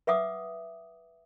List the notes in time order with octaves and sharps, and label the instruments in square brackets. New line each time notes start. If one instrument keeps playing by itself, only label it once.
[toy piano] B4 E5 F#5 D6 D#6